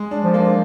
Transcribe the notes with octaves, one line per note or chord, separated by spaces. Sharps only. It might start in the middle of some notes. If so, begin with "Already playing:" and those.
Already playing: G#3
D4
F3
A#3